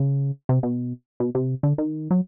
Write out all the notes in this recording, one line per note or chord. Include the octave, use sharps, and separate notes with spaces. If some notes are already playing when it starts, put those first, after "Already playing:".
Already playing: C#3
C3
B2
B2
C3
D3
D#3
F#3